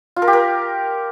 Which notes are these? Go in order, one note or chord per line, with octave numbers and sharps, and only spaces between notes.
F4
A#4
G4
A#4